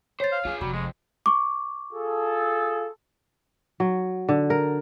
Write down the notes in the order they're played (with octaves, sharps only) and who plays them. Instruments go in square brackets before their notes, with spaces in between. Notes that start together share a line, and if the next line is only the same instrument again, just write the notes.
[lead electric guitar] C5 [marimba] C#5 A6
[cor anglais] F5
[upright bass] D4 E4 [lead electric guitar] F4 G#4
[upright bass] F1 C3 [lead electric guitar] F#3 [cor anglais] G3
[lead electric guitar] F2 [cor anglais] G#3
[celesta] C#6 D6
[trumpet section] F4 G#4 A4
[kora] F#3
D3
A#4